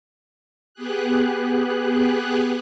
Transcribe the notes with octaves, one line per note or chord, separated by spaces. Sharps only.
B3 G4 G#4 F#6